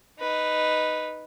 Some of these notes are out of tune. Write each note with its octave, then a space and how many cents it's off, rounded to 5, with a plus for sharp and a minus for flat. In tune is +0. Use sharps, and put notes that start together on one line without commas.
D#4 +0 B4 +0